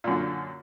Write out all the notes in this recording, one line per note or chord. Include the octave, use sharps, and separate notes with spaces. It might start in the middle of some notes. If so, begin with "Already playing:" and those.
F#2 A#2 D3